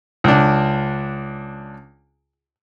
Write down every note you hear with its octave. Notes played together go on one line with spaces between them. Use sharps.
C#2 D4